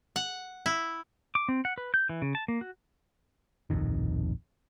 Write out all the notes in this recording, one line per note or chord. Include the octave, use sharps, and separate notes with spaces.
F#5
E4
D6
C4
F#5
B4
G6
E3
C#3
A5
A#3
F#4
D1 A#1 F2 D#3